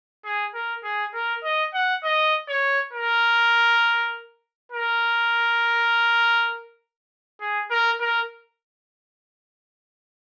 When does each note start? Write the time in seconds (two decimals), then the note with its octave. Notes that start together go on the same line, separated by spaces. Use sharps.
0.24 G#4
0.54 A#4
0.84 G#4
1.14 A#4
1.44 D#5
1.74 F#5
2.04 D#5
2.48 C#5
2.93 A#4
4.72 A#4
7.41 G#4
7.70 A#4
8.00 A#4